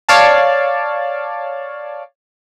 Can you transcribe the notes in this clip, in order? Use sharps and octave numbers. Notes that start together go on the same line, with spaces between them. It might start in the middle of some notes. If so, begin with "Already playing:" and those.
C#5 D5 F5 A5